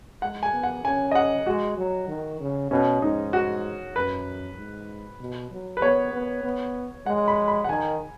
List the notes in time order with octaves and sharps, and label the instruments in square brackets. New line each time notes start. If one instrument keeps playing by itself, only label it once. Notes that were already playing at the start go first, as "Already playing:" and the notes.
[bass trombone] G#3 [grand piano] F#5
[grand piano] G#5
[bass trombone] B3
[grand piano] F#5
[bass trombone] C#4 [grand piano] G#5
[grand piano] D#5
F#5
[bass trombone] G#3 [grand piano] F#4
[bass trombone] F#3
D#3
C#3
[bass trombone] B2 [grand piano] C#4
[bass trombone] G#2 [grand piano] D#4
[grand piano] F#4
[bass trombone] F#2 [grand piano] B4
[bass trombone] G#2
B2
F#3
[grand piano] B4
[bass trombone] B3 [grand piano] C#5
[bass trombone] B3
B3
[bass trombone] G#3 [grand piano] F#5
[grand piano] B5
B5
F#5
[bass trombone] D#3 [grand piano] G#5